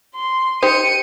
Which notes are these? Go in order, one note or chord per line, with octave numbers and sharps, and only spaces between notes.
C6
D#4 G4 C5 C#7 D#7